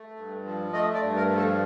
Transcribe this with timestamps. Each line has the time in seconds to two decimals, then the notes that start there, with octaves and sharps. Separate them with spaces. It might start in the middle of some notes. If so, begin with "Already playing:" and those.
Already playing: A3
0.17 G2
0.45 F3
0.73 A3 D#5
0.94 D5
1.02 G2
1.17 A#4
1.30 F3
1.37 A4